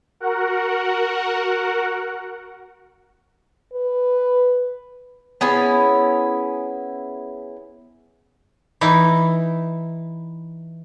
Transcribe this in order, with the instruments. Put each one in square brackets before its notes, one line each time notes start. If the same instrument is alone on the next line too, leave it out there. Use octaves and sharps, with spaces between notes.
[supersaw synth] F#4 A#4 F#5
[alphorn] B4
[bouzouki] B3 C#4 E4 G#4
[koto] E3 D#4 E4